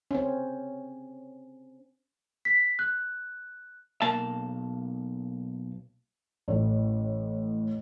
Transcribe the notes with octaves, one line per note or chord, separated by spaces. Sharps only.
C4 C#4
B6
F#6
B1 A#3 A5
A1 A2